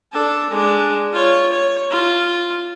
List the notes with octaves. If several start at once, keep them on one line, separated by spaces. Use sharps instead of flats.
D4 A4
G#3 D4
F4 C#5
C#5
F4